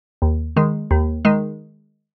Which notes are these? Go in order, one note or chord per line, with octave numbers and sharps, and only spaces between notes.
D#2
D#3 G#3
D#2
D#3 G#3